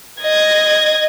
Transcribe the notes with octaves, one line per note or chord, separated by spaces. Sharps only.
D#5 G#6